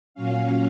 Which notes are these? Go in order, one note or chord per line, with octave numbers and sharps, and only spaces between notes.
A#2 F#3 C#4 F5